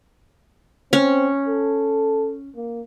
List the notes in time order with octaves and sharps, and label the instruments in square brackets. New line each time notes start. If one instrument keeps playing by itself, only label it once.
[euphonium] C4 [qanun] C#4
[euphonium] A4
A#3